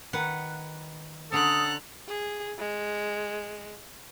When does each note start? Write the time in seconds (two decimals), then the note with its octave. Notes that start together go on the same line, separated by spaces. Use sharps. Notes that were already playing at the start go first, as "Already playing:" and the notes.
0.13 D#3 B4 F#5
1.32 D3 C#4 A4 A#5 D#6 F#6
2.08 G#4
2.59 G#3